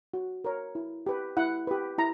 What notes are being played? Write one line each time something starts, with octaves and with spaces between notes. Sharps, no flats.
F#4
A#4 C#5
E4
G4 B4
E4 F#5
G4 B4
E4 A#5